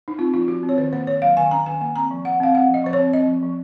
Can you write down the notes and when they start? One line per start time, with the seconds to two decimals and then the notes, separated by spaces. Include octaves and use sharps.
0.08 D#4
0.18 C4 F4
0.34 F3 F4
0.48 F3 F#4
0.63 C4
0.69 C#5
0.78 D#3 C5
0.93 A#3 C5
1.07 D#3 C#5
1.22 F#3 F5
1.37 D#3 G#5
1.51 C#4 A#5
1.66 D#3 G#5
1.81 A#3 G#5
1.96 C4 A#5
2.11 F3
2.25 F3 F#5
2.40 C4 F5
2.54 C4 F#5
2.69 F3
2.74 D#5
2.84 F3 C5
2.93 C#5
2.99 C4
3.13 C4 D#5
3.28 F3
3.42 F3